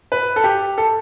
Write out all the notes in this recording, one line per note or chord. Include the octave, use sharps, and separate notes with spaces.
B4
A4
G4
A4